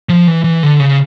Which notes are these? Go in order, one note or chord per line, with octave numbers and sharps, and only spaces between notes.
F3
E3
E3
D3
C#3